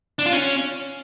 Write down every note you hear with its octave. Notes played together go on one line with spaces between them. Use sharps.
D4
F4
C#4